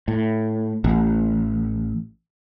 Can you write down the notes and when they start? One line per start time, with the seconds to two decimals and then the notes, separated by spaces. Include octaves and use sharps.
0.08 A2
0.84 A1